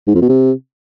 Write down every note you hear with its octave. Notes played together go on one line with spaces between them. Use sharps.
G#2
F2
B2
C3